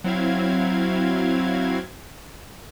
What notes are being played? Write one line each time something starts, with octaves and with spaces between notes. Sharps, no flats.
F#3 C4 E4 F5 G#6